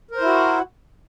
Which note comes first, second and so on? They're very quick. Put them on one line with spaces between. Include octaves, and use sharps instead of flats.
A#4 C5 E4 F#4